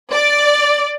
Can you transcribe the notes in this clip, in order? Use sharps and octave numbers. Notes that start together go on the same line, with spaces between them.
D5